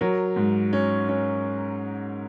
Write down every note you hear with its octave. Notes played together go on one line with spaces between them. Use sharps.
F#3 A#4
G#2
C#4
C#4